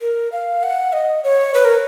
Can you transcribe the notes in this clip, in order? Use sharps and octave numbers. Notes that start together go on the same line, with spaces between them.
A#4
F5
F#5
D#5
C#5
B4
A#4